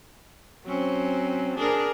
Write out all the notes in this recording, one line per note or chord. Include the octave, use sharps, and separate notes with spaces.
F#3 C4 C#4
D4 G#4 A#4